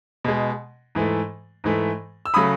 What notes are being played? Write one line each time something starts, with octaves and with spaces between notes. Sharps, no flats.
B2 G#3
G#2 E3 A3
G#2 E3 A3
E6
C#3 F#3 A3 B5 D#6